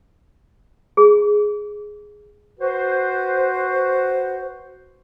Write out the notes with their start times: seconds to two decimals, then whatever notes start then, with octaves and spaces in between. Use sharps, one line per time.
0.97 G#4
2.60 F#4 B4 C5